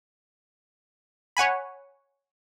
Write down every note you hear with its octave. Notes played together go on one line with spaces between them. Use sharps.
C#5 F#5 G#5 B5